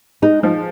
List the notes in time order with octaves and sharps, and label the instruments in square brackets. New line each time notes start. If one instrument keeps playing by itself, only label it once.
[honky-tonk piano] G#3 [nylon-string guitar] D#4
[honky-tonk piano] F3 [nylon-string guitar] D#4